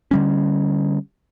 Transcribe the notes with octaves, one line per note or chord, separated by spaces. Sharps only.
D3 G3 C#4